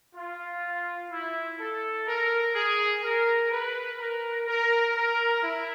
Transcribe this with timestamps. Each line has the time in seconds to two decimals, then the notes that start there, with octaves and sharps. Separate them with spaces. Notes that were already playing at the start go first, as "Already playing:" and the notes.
0.15 F4
1.11 E4
1.59 A4
2.07 A#4
2.55 G#4
3.03 A#4
3.51 B4
3.99 A#4
4.47 A#4
4.96 A#4
5.43 E4